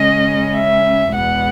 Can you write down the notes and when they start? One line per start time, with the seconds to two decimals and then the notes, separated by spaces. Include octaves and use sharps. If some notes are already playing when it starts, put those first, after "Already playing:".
Already playing: C#3 G#3 C#4 D#5
0.57 E5
1.15 E2 B2 G#3 B3 F#5